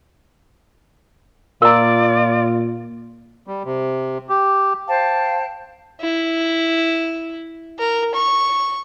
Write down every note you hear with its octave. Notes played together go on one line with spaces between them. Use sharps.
A#2 F4 A#4 D5 A#5
G3
C3
G4
C5 F5 G5 A5
E4
A#4
C#6